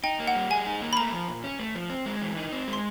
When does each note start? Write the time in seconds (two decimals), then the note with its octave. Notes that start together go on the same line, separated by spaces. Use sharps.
0.04 D#4 G5
0.20 A#3
0.27 F#5
0.35 G3
0.50 G#4 G#5
0.66 D#4
0.82 A#3
0.93 B5
0.97 A3 A#5
1.12 F3
1.28 A#2
1.44 C#4
1.59 A3
1.75 F3
1.90 C4
2.06 G#3
2.22 E3
2.37 D#4
2.53 C4
2.68 G#3
2.73 C6